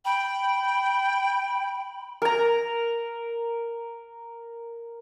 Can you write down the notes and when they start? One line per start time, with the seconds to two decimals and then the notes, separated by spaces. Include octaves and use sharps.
0.05 G5 B5
2.22 A#4 A#5